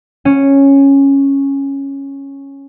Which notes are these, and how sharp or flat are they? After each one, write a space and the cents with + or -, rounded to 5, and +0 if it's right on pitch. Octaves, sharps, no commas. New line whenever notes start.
C#4 -5